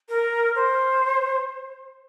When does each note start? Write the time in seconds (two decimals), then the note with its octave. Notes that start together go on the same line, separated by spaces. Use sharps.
0.09 A#4
0.55 C5